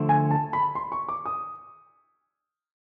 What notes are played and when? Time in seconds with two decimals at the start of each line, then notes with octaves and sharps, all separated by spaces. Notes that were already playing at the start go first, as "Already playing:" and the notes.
Already playing: D3 F3 A3
0.09 G#5
0.31 A5
0.53 B5
0.75 C6
0.92 C#6
1.09 D6
1.25 D#6